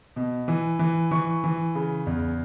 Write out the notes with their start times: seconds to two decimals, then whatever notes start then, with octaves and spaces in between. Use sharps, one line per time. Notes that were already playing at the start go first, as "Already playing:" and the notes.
0.16 B2
0.48 E3
0.79 E3
1.11 E3 C#6
1.44 E3
1.75 C#3
2.06 E2